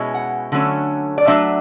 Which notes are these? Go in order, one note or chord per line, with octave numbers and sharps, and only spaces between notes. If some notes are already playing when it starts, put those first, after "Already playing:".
Already playing: B2 G#3 C#4 E4
F#5
D3 F#3 A3 C#4
D5
F#3 A3 D4 E5